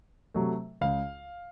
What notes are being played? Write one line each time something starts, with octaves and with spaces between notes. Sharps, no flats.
C3 F#3 A3
C#2 F5